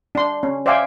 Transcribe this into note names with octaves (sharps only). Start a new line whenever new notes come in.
D4 C6
C#4
C5 D5 E5 F5 G5 G#5